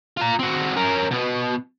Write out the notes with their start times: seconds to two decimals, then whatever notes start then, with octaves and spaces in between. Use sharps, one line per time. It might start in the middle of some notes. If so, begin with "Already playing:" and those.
0.17 F4 A#5
0.39 C4 F#4
0.75 C#4 A#4
1.11 B2 B3